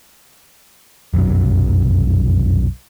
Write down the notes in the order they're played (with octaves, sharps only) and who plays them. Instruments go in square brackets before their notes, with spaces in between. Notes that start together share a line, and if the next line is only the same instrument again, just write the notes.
[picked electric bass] F1 B1 F#2 F#3